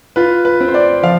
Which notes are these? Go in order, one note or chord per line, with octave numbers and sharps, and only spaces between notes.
F4 B4
B4
C4
C5
D5
F3 F5